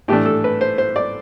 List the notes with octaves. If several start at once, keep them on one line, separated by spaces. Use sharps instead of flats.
A2 E3 A3 D4 G4
A4
B4
C5
C5
D5